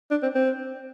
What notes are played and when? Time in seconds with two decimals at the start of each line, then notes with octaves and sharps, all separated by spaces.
0.11 D4
0.23 C4
0.35 C4